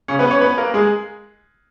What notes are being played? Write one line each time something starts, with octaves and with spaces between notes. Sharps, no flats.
C#3 C#4
B3 B4
C#4 C#5
B3 B4
A#3 A#4
G#3 G#4